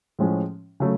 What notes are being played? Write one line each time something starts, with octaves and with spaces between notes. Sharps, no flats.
A2 F3 G#3 C#4
C#3 F#3 A3